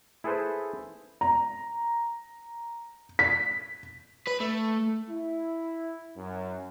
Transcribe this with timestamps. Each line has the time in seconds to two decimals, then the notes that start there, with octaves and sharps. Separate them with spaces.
0.24 E4 G#4 A4 B4 C5
1.21 A#5
3.19 B6
4.27 B4
4.40 A3
5.10 E4
6.17 F#2